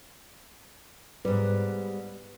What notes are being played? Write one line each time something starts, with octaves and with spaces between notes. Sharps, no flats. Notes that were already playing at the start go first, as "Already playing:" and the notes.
G#2 G3 B4